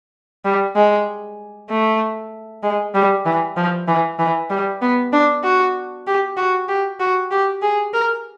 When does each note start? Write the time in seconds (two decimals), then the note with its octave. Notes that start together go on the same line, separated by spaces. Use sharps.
0.45 G3
0.76 G#3
1.70 A3
2.63 G#3
2.95 G3
3.26 E3
3.57 F3
3.88 E3
4.19 E3
4.50 G3
4.82 B3
5.13 D4
5.44 F#4
6.07 G4
6.37 F#4
6.68 G4
7.00 F#4
7.31 G4
7.62 G#4
7.94 A#4